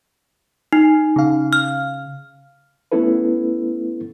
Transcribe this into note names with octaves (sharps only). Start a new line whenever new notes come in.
D#4
C#3 F5
F6
A3 B3 C#4 E4 A4 B4